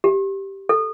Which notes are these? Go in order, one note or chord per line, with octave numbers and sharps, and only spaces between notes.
G4
A4